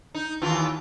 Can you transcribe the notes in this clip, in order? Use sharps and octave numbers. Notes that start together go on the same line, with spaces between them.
D#4
D#2 E3 F4